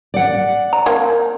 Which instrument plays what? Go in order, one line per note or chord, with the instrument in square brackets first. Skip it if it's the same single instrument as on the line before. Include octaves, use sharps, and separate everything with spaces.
[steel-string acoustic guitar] D5 F#5
[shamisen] A#5
A#3 C4